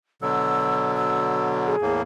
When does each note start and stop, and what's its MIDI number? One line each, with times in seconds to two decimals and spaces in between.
0.22 1.76 47
0.22 1.76 50
0.22 1.76 54
0.22 0.92 88
0.97 1.48 88
1.67 2.00 68
1.82 2.02 40
1.82 2.02 45
1.82 2.02 58